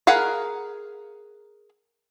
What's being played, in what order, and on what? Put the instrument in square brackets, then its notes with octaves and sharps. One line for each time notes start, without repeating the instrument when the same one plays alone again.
[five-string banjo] G#4 A#4 F5 F#5 B5